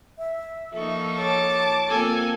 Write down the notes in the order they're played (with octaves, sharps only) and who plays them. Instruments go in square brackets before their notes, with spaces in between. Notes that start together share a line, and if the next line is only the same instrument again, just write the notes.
[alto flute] E5
[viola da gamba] F3 A#3 D#4 [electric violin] A4 C#6
[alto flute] C#5 [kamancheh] A5 D6
[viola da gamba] A#3 C4 F4 [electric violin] A4 G#5